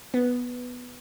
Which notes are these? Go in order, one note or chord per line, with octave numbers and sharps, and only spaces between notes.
B3